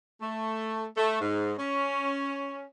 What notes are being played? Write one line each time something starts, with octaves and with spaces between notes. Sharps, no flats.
A3
A3
G#2
C#4